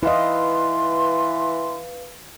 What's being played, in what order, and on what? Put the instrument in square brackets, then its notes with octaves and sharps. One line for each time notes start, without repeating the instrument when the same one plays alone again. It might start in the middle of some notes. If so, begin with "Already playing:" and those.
[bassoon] E3 [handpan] E4 D#5 [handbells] B4 F5 [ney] C6